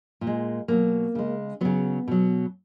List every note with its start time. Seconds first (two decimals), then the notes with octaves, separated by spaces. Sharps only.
0.21 A#2
0.27 G#3
0.68 B2 F#3 A#3
1.15 C#3 G#3
1.61 C#3 F#3 B3
2.08 B2 F#3